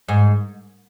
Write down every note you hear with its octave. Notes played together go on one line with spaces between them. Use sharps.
G#2